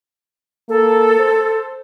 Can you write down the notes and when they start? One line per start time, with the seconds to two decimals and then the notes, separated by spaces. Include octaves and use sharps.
0.69 A#3 A4
1.19 C5